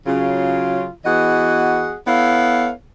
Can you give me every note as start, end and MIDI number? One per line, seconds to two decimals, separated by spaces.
0.06 0.88 49
0.06 0.88 54
0.06 0.88 65
1.05 1.95 52
1.05 1.95 59
1.05 1.95 66
1.05 1.95 68
1.05 1.95 75
1.05 1.95 78
2.07 2.71 59
2.07 2.71 64
2.07 2.71 69
2.07 2.71 73
2.07 2.71 77